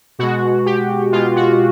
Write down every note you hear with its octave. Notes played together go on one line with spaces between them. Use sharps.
B2 G#3 F#4
G4
B2 G#3 F4
F#4